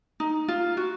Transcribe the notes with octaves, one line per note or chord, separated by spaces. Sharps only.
D#4
F4
F#4